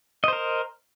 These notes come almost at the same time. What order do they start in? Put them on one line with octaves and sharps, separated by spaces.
D#5 C5 A#4